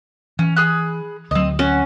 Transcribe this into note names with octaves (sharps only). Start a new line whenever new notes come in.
E3 C#4
G#4 B5 F#6
D2 F#3 C4 D#5
C#4 F#4